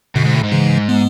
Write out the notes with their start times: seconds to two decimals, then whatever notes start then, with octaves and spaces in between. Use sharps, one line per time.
0.16 F#2 B2 D3
0.25 G#2
0.35 A2
0.43 G#2
0.52 C#3 E3
0.89 G#3 B3